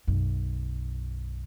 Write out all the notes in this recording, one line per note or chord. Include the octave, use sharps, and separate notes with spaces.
B1 F#2